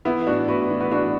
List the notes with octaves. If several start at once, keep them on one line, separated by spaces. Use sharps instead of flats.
E3 B3 E4
A2 D4 F#4
A2 F#4 B4
E3
F#4 B4
E3 D4 F#4